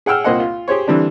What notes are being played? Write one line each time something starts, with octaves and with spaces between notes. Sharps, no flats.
G#4 F#5 G5 E6 F6
C2 A#2 A#3 C5 D#5 F#5
F4
G4 G#4 C5 C#5
D3 E3 G3 C4 D4